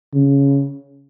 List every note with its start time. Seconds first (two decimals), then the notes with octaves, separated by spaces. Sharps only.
0.14 C#3